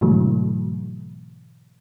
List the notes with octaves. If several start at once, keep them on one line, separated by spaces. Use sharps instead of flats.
G#2 B2 D3 E3 F#3 A3